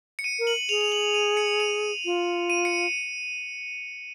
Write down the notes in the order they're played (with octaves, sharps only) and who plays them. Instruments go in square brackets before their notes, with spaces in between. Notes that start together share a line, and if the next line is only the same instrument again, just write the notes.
[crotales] C#7
D#7
[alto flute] A#4
[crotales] F#7
[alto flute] G#4 [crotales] F7
[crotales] F7
F#7
D#7
C#7
D#7
[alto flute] F4
[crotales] D#7
C#7